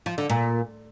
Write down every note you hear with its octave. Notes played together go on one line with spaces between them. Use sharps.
F3
D3
A#2